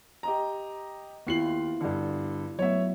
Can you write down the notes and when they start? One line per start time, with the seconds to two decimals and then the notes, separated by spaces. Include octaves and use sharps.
0.23 G4 D#5 A#5
1.27 D#2 B3 E4 F4 C7 F#7
1.81 G2 D3
2.59 F#3 A3 B3 C#5 E5